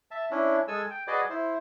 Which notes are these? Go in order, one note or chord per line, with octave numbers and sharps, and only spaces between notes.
E5 A5
C#4 D4 E4
G#3 A4 G#5 E6
G5
F#4 G#4 B4 D5 D#5
E4 C5